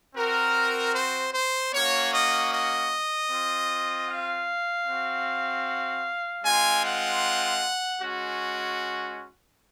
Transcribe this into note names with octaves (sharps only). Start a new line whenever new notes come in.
C4 F#4 A#4
C5
C5
A#3 C#4 F#4 C#5
D#5
D#5
C4 F4
F5
C4 F#4
G#3 C4 F4 G#5
F#5
G#3 C#4 F#4